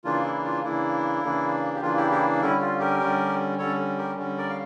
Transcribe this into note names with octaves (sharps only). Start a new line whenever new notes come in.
C#3 E3 A#3 D4 F4
E4
F4
C#3 E3 A#3 D4 E4
C#3 E3 A#3 D4
G4
C#3 E3 A#3 D4 F4
E4 G4
E4 G4
D3 G3 C#4 E4
F4
G4 A#4
D3 G3 C#4
D3 G3 C#4 A4 C#5
G4 A#4
D3 G3 C#4
A#4 D5
F5